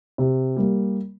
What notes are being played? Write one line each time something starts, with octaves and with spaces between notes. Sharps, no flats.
C3
G3 A#3